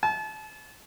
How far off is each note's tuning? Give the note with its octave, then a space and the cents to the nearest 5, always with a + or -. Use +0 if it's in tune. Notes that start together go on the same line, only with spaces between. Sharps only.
A5 -35